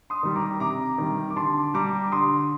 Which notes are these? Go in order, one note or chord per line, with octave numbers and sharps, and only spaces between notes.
C6 D#6
D#3 G3
A#5 D6
C3 A#5 D6
D#3 G3
D6
D3 A5 C6
G3 A#5 D6
D3 C6 D#6